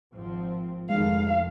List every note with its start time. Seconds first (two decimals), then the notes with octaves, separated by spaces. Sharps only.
0.14 G#1 F3 C4
0.90 F1 D#3 G#3 A3 F5